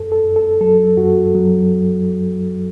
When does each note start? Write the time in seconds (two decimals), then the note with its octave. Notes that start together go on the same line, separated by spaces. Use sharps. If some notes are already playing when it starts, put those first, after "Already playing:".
Already playing: F#2 A4
0.12 A4
0.24 F#2
0.36 A4
0.61 F#3 A4
0.97 F#2 F#4
1.35 F#3